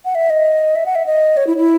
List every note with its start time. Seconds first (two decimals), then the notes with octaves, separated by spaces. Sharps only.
0.05 F#5
0.15 E5
0.30 D#5
0.76 E5
0.86 F#5
0.95 E5
1.06 D#5
1.37 C#5
1.47 E4
1.57 E4